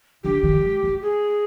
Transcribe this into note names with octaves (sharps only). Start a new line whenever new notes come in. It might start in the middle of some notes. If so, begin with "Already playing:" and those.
D3 G4
D#3
G3
G#3
A3
G#4